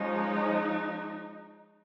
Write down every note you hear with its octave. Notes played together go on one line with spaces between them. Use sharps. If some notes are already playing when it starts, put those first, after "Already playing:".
Already playing: F3 G#3 C#4 D#4